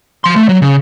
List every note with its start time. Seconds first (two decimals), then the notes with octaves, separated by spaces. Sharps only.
0.24 F3 C6
0.36 A3
0.49 F#3
0.62 C#3